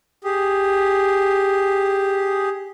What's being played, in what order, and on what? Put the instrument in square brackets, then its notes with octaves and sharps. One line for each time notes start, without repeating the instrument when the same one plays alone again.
[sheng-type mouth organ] G4 G#4